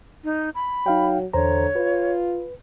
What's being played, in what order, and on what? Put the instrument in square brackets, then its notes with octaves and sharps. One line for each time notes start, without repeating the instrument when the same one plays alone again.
[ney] D#4
B5
[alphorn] F#3 [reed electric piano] D#4 F5 G5
[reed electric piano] E2 C5 A#5 [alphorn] D3 [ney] C#5
[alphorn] F4 [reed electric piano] B4